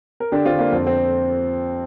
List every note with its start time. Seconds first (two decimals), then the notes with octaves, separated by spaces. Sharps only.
0.20 A#4
0.32 D3 D4 G4
0.45 C4 F4
0.52 D3
0.59 A#3 D4
0.72 F2 C4
0.87 C4